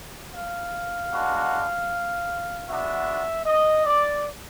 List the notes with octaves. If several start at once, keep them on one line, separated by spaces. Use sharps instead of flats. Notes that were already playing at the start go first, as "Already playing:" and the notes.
F5
G#3 B3 D4 F#4
G#3 B3 D4 F#4 E5
D#5
D5